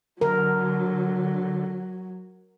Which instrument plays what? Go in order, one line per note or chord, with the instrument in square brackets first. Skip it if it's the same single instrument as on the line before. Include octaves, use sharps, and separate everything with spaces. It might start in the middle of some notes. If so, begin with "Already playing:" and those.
[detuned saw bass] D3 [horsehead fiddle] F#3 [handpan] A#4